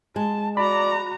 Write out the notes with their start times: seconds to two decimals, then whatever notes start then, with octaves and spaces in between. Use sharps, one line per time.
0.16 G#3 A5
0.57 F#4 D5 A#5 B5